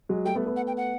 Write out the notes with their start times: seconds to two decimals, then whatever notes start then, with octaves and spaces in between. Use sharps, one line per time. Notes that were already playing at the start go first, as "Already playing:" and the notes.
0.09 F#3 G#3
0.25 G3 A3 G5
0.35 A3 B3
0.46 A3 B3
0.56 F#5
0.67 G5
0.77 F#5